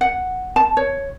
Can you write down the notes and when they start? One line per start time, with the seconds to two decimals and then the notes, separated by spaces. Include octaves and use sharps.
0.01 F#5
0.56 A5
0.77 C#5